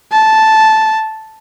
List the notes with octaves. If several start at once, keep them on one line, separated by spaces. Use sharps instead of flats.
A5